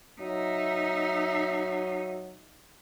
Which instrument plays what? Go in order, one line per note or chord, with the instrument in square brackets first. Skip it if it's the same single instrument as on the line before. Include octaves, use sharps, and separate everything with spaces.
[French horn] F#3 [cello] D#4 E5